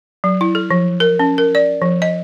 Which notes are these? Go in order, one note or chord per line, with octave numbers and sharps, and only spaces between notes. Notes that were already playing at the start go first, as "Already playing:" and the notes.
F#3
E4
A4
F3
A#4
C#4
A#4
D5
F3
D#5